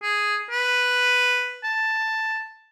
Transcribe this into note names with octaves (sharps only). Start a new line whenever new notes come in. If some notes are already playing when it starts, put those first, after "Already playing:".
G#4
B4
A5